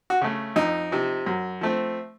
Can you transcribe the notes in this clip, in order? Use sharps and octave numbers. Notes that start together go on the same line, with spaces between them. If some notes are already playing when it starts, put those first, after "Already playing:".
F#4
C#3 A3
F2 D#4
C3 F3
F#2
F3 A3 C4